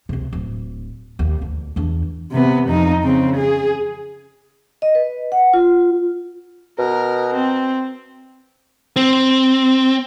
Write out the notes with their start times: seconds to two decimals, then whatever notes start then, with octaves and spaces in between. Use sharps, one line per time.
0.09 C#2 C3
0.33 D1
1.19 D#2
1.41 D2
1.76 E2 D4
2.32 C3 B3
2.68 F2 D#4
3.03 C#3 C4
3.37 G#4
4.82 D#5
4.95 B4
5.32 F#5
5.54 F4
6.79 B2 A#4
7.34 C4
8.96 C4